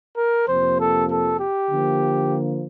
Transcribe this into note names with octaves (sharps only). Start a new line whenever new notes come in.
A#4
F2 C3 F3 A#3 C5
A4
A4
G4
D3 F3 A#3